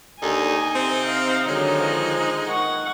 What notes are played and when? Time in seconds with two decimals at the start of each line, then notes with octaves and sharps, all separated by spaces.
0.22 D#2 D3 D#4 G#5
0.75 C3 C4
1.06 F5
1.48 D3 D#3 F#3 G#3
1.81 F3
2.49 D#3 F#5 C#6